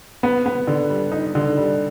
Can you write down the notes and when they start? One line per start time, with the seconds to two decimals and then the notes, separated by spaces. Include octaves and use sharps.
0.23 B3
0.46 B3
0.67 D3
0.90 G3
1.12 D#4
1.35 D3
1.57 G3